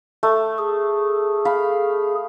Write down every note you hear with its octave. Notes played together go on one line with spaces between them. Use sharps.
A3
G#4
F5 B5